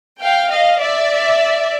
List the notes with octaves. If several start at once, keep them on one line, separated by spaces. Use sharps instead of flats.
F5 G5
D#5 F5
D5 E5